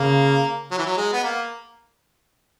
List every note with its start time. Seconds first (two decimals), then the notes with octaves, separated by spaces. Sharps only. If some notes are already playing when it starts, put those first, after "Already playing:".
Already playing: C#3 A#3
0.71 F#3
0.78 E3
0.86 F#3
0.97 G#3
1.13 B3
1.24 A#3